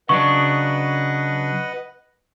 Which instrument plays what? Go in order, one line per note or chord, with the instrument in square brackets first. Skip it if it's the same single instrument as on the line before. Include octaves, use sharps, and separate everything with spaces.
[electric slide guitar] C#3 F#3 D4 [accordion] B4 D#5 F#5 [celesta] C#6